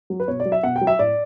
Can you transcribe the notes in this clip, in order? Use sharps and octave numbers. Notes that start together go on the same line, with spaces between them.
F#3
B4
B2 C#5
D5
F#3
E5
B2 F#5
G5
F#3
E5
A2 D5